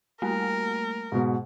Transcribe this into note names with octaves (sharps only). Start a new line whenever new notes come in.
G3 A3 A#3 A#4
G#2 B2